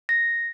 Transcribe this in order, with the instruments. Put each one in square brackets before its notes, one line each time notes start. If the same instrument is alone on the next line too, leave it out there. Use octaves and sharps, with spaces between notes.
[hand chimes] A#6